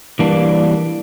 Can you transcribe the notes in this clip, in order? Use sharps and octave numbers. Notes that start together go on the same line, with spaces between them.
E3 G3 A#3 D4